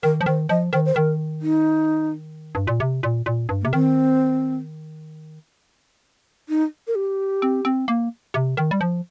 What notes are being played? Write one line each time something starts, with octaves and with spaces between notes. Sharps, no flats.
D#3 A#4
F3
D#3 C5
F3 D#5
D#3 C5
C5
D#3 A#4
D#4
G2
A#2
C3
A#2
A#2
G2
C3 A#3
D#3 C4
D#4
A#4
G4
C4
C4
A#3
C3
D#3
G3
F3